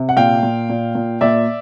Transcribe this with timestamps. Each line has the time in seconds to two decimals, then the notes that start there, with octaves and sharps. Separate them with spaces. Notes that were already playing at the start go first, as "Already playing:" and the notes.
Already playing: C3
0.09 F#5
0.17 A#2 F5 G5
0.43 A#2
0.70 A#2
0.95 A#2
1.21 A#2 D5 E5